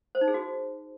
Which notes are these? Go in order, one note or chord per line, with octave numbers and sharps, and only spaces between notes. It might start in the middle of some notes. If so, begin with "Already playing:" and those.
C5
D#4
G#4
F#4